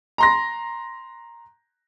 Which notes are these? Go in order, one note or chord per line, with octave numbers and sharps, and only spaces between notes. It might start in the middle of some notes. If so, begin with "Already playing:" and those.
A#5 C6 A#6